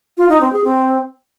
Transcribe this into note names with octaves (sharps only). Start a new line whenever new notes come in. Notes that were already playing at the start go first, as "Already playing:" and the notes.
F4
D#4
C4
G#4
C4